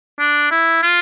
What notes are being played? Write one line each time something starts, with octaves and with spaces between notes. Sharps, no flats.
D4
E4
F4